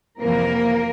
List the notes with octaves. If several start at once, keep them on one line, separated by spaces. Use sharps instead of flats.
F2 C3 E3 A#3 A#4